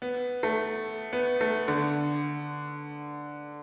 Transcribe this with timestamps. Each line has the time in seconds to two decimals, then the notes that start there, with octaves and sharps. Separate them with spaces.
0.02 B3
0.43 A3
1.13 B3
1.41 A3
1.68 D3